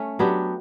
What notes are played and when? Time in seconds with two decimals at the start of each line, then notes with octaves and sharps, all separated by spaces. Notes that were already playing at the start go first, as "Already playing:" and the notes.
Already playing: A3 C#4
0.19 F#3 B3 D4 G4